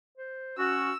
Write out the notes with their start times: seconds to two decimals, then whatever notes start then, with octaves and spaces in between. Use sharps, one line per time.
0.17 C5
0.58 C#4 F#4 E6